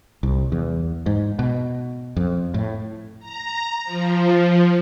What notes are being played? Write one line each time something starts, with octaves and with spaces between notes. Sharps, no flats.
C2
E2
G#2
B2
F2
A2
A#5
F3